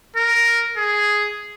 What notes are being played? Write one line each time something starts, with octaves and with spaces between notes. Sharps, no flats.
A#4
G#4